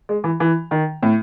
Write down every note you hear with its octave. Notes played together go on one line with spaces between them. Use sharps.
G#3
E3
E3
D#3
A2